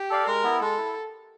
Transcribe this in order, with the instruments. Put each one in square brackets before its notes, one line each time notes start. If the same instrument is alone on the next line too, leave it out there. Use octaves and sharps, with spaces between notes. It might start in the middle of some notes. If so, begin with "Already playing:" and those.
Already playing: [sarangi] G4
[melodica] A4 D5 F5
[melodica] G#3 [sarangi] A#4
[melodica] B3 E4
[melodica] G#3 [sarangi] A4
[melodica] E4